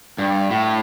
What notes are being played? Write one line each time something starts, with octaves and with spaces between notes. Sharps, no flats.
G2
A2